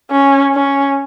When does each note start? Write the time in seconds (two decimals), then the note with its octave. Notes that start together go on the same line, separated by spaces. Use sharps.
0.11 C#4
0.54 C#4